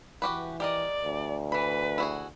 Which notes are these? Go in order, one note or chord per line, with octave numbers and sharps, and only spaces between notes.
E3 F#4 G4 B4
G4 A#4 D5 D#5
D2
E3 B4 B5
E4 F#4 G#4